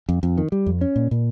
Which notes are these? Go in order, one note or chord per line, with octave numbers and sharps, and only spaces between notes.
F2
F2
D#3
G3
F2
C#4
A#2
A#2